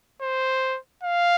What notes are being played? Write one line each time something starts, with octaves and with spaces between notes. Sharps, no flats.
C5
F5